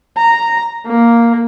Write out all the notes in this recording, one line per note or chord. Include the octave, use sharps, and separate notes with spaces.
A#5
A#3